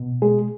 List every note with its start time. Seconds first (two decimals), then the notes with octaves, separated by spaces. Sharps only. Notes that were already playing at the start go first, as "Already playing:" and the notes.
Already playing: B2
0.22 G#3 G#4